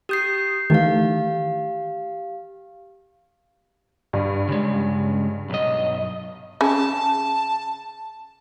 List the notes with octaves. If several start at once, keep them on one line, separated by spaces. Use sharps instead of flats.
G4 D#6 G6 C7
D#3 E3 A3 G4 F5
G2
C#3 G#3
B1 D#5
C#3 A5